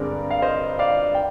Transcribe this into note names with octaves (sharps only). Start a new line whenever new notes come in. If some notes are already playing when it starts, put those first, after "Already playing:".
Already playing: G2 D3 G#3 C4 A#4 D5
F5
C5 D#5
D5 F5
G5